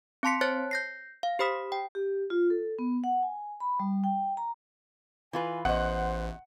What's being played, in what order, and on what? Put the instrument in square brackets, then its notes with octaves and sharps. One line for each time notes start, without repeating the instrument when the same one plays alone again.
[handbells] C4 F5 A5 C6 B6 C#7
C5 C#5 A5 F#6 A6
G6 A#6 C7
F5
G4 C5 B5 D#6 B6
G5
[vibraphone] G4
F4
A4
B3
F#5
G#5
B5
G3
G5
A#5
[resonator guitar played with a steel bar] E3 F4 B4 [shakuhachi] G#5
[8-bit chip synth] A1 [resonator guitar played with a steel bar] E2 D#5 [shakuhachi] C5 [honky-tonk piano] F#5